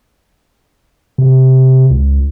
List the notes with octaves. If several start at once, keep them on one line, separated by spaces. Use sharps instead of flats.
C3
C#2